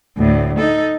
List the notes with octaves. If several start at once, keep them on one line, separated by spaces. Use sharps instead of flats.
D2 A2
D#4 A4